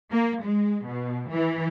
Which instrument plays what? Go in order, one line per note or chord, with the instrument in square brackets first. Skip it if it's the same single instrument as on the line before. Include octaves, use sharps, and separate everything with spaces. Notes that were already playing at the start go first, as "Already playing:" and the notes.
[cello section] A#3
G#3
B2
E3